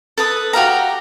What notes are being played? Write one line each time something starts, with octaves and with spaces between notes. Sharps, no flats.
A4 B4 D#6
F#4 G4 F5 A#5